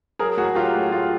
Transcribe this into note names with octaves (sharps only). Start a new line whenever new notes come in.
F#3 G#4 A#4
A2 F#4 G#4
F#3 F4 G4
A3 F#4
A2 F4